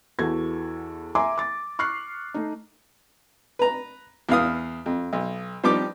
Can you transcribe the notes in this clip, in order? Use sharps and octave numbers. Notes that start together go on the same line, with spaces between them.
E2 E3 F#4 A4 G#6
E5 G#5 A#5 C6 D6
D6 A6
C#6 F6 F#6 C7
A3 D#4
B4 A#5
E2 E4 F5 D#6
F2
B1
F3 G3 D#4 G4 D6